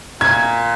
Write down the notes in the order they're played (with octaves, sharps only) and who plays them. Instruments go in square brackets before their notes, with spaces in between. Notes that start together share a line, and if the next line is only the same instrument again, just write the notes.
[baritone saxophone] A#2 [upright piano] G#6